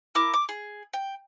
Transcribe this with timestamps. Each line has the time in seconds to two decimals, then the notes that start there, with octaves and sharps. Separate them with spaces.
0.15 E4 A#4 D6
0.34 D6
0.49 G#4
0.93 G5